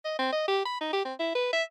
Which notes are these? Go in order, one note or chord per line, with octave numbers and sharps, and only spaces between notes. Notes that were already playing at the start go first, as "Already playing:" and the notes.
D#5
C4
D#5
G4
B5
D#4
G4
C4
E4
B4
E5